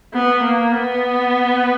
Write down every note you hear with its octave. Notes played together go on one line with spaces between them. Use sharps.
B3
A#3
B3